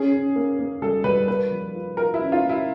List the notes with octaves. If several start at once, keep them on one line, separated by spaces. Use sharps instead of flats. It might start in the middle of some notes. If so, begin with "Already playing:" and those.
Already playing: C#4 G#4
C#4
A#3
A#3
G3 A4
G3 B4
A#3 B4
F3
F4
F4 A#4
E4
C#4
F4
A#3
E4